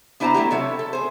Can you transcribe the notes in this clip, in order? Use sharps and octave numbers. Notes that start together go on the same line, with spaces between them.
B3 D4 E4 C5 A5 A#5
F#3 A3 E4 G4
C3 A4 C#5 E5
A4
G#4 C5